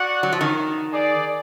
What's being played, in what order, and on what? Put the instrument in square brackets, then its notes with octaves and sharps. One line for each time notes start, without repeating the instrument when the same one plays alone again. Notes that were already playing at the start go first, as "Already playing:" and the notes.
Already playing: [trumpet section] F#4 D5 F#5
[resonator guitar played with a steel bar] F#3
F3
D#3
[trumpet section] D#4 G#4 D5